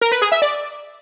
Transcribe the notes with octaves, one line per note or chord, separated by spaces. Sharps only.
A#4
B4
G#4
E5
D5